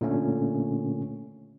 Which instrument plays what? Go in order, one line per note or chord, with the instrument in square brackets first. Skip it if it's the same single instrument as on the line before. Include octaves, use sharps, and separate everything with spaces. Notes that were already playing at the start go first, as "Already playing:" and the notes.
[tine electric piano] A#2 D3 A3 C#4